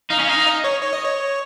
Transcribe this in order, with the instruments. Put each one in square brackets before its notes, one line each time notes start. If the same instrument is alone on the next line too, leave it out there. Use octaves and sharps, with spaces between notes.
[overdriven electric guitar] D#4 [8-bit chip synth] F5
[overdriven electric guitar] C#4
[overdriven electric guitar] D#4 [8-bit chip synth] F5
[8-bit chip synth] D#5
C#5
C#5
D#5
C#5